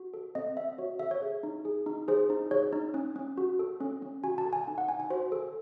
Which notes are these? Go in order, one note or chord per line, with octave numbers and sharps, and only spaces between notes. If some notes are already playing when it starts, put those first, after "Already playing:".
Already playing: F#4
A4
C4 D#5
C4 E5
F#4 C#5
A4 E5
C#5
G#4
D#4
G#4
D#4
G#4 C5
D#4
G#4 C#5
D#4
C#4
C#4
F#4
A4
C#4
C#4
F#4 G#5
A5
A4
G#5
D#4 G#5
F#5
D#4 G#5
G#5
F#4 C5
A4